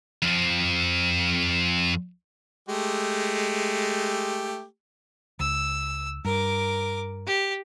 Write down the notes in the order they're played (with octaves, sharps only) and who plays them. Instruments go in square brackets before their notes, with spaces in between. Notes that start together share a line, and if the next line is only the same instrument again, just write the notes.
[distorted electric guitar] F2 F3
[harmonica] G#3 A3 G4
[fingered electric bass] C#2 [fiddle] E6
[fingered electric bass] G2 [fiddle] A#4 D6
[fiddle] G4